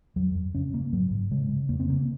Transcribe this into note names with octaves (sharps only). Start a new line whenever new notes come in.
F2 F#3
F2
C#3 C#4
C#3 A#3
G#2 F#3
G#2
C#3 G#3
C#3
F2 A#3
C4
C#3 A#3